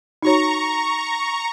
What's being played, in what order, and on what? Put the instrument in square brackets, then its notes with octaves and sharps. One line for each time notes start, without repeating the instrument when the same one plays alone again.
[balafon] D#4 F#4 C#5 [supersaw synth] A#5 C#6